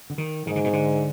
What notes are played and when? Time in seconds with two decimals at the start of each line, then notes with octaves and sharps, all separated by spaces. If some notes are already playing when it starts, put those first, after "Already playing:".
0.10 D3
0.18 D#3
0.47 G#2 D#3
0.56 D3
0.64 B2
0.73 D3